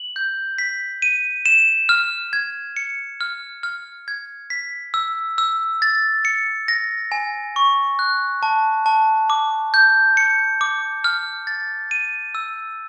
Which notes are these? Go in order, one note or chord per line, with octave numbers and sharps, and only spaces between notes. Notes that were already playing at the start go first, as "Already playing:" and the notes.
Already playing: F#7
G6
B6
D#7
E7
F6
G#6
C#7
F6
F6
G#6
B6
E6
E6
A6
C#7
A#6
G#5
C#6
F#6
A5
A5
D6
G6
C#7
D6
F6
A6
D#7
E6